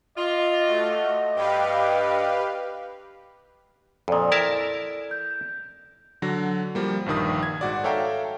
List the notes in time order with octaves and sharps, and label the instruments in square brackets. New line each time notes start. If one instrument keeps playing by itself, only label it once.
[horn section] F4 [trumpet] D#5
[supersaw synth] A3 F#4
[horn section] G2 [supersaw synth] G4 B4 F5
[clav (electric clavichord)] F2 A#2 [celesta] A4 D5 D#6
[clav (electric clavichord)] E4 A#4 A5
[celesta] G6
[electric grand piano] D3 F#3 A#6
F3 G3 A#3
A#1 G2 D#3 D#6
G#6
G#2 F#4 D5
A4 C#5 E5 F5 G5 A#5